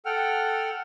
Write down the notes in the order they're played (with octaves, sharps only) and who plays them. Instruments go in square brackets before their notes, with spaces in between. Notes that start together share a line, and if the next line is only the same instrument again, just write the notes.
[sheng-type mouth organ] A4 F#5 G5 F6